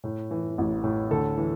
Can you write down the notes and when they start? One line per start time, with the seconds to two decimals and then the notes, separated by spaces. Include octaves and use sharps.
0.04 A2
0.31 E3
0.58 A1
0.84 A2
1.11 D2 A4
1.38 E3